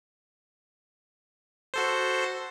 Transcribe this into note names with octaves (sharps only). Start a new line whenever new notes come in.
F#4 A4 C5